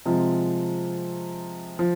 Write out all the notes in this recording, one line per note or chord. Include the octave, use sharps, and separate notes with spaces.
C3 F3 G#3
F3